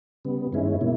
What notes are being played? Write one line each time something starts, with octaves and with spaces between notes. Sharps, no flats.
C#3 G3 B3
G2 D#3 G#3 C#4 E4
B2 A#3 E4